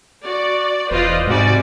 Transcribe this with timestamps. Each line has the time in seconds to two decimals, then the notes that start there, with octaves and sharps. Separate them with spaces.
0.24 F#4 D5
0.91 E1 F4 B4 C5 D5 D#5
1.27 G#2 C3 G3 G#3 F#4 D5